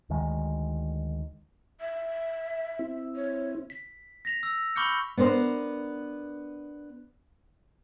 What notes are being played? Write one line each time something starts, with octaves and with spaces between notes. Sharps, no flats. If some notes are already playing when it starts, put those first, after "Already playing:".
D2 D#3 G#3
E5
C4 E4
C#5
B6
A#6 B6 F7
E6
B5 C#6 D6 F6 G6 C#7
B3 D4 A#4 C5